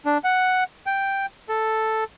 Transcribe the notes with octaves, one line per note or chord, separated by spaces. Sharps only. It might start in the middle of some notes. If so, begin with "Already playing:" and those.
D4
F#5
G5
A4